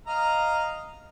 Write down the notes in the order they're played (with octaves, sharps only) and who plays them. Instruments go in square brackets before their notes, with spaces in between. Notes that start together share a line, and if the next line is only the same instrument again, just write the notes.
[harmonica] D#5 F5 A#5